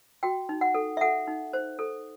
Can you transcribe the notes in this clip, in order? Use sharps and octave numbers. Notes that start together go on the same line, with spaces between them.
F#4 G5
D#4
F#5
A4
E5
A4 F#5
D#4
C5
A4